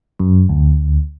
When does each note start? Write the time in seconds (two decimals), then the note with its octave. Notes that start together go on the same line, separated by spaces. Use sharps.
0.19 F#2
0.49 D2